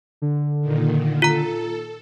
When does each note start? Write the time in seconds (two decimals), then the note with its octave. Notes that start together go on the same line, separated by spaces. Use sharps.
0.22 D3
0.61 A#2 D#3
1.22 F4 A4 A#5